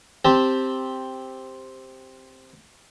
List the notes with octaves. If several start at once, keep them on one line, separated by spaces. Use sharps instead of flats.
C4 G4 A5